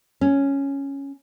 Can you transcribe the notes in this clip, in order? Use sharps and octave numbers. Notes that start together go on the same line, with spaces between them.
C#4